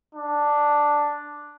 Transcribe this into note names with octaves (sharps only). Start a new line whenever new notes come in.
D4